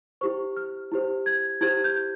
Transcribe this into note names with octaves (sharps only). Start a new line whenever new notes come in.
E4 G4 C5 C#6
F6
E4 G4 C5
G#6
E4 G4 C5 G#6
G6